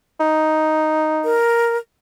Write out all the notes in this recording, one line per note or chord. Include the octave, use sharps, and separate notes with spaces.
D#4
A#4